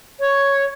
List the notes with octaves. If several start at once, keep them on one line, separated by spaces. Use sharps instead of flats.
C#5